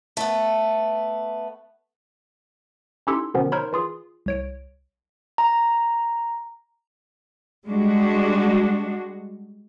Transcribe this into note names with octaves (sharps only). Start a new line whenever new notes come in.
A3 B3
C#4 D#4 E4 G4 A4 C6
B2 D3 D#3 F3 B3 C#4
D#4 A#4 C5 C#5 B5 C6
E3 F4 G#4
C2 C#5 D7
A#5
G3 G#3 D4 F#4